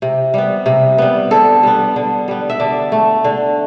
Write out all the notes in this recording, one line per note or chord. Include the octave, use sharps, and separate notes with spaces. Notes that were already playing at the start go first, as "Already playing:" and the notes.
C3
G3 B3
C3
G3 B3
D3 A4
G3 B3
D3
G3 B3
E5
D3 D5
A3
D3